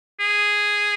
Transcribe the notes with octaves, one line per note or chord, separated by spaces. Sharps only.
G#4